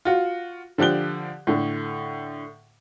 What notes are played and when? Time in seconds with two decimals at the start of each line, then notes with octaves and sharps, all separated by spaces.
0.05 F4 F#4
0.78 D3 F3 G4 F#6 G7
1.47 A2 D3